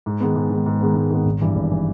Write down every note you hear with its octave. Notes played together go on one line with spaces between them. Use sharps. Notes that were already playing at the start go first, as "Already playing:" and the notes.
G#2
D#3 G#3 B3
G#2
D#3 G#3 B3
G#2
D#3 G#3 B3
G#2
D#3 G#3 B3
G#1
G2 E3
G#1
E3